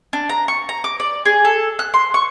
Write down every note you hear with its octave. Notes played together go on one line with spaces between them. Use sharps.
D4
A#5
C#6
A#5
D6
D5
G#4
A4
F#6
C6
C#6